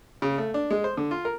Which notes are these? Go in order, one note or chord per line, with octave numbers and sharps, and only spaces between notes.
C#3
A3
D4
G#3
C5
D3
F4
A#4